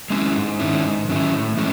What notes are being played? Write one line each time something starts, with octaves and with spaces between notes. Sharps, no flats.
G#3 C#4 E4
G#2
D#3 F#3 C#4 E4
G#2
D#3 F#3 C#4 E4
A2
E3 G#3 C#4